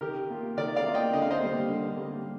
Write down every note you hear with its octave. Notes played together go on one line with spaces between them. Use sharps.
D#3 G4 A#4
A#3 F4
D#3 A#4 D5
D5 F5
A#3 F4
D#5 G5
D3 D#5
F5
C5 D#5
G3 A#3
D3
G3 A#3